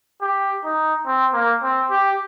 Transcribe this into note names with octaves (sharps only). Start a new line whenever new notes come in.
G4
D#4
C4
A#3
C4
G4